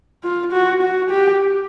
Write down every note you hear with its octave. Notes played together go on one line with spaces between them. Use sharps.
F4
F#4
F#4
G4